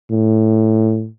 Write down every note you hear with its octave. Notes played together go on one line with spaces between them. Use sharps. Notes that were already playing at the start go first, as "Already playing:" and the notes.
A2